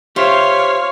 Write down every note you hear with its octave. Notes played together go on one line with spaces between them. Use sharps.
F4 G4 C5 C#5 E5 F5